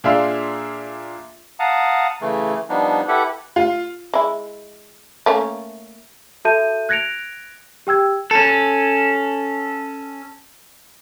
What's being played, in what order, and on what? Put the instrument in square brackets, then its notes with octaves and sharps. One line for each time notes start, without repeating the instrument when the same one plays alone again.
[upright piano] A#2 D4 G#4 E5 F5 C6
[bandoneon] F5 F#5 A5 A#5 D#6
C#3 E3 A3
F3 G3 B3 D4 D#4
E4 G4 A4 B4 E5 F#5
[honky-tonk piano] F4
[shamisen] G#3 E4
A3 A#3 C#4
[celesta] F#4 A4 E5 A5 G6 D#7
F#6 G#6 A#6 C#7 D7 F7
G4 G5 E6 G#6
[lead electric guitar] C#4 A4